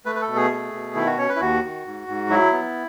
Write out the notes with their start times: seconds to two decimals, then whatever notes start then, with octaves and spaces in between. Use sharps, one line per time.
0.05 A3 B4
0.15 B4
0.21 A4
0.28 B2
0.36 G#4
0.51 A3
0.73 B2
0.95 D#3 E4
1.06 F#4
1.18 C#4 C#5
1.29 B4
1.36 E4
1.40 D#2 F#4
1.63 D#3
1.86 G#2
2.08 G#2
2.29 F#3 E4
2.52 B3